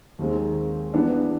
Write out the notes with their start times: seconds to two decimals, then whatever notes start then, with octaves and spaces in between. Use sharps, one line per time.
0.19 D#2 D#3 G#3 C4
0.93 E3 G3 B3 D4